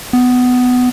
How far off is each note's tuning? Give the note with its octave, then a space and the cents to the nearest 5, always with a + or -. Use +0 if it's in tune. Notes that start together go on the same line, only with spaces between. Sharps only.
B3 +15